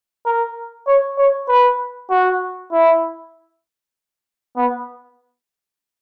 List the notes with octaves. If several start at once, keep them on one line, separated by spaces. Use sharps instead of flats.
A#4
C#5
C#5
B4
F#4
E4
B3